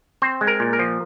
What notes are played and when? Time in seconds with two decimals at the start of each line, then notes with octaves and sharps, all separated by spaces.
0.22 C4 C5
0.41 G#3
0.47 A#4
0.60 A#2
0.73 A#4
0.79 F3